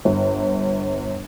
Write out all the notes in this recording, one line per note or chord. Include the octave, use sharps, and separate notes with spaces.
G1